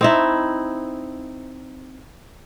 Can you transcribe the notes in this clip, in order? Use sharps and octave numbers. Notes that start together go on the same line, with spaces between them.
C4 D#4 E4